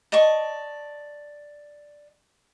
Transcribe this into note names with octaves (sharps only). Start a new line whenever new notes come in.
D5 D#5 A5 C#6